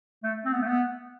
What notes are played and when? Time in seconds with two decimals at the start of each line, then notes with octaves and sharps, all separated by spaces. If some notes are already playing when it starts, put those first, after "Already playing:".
0.23 A3
0.45 C4
0.53 B3
0.62 A3
0.68 B3